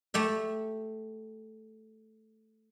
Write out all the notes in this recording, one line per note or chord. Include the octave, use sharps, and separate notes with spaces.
A3 G4 E5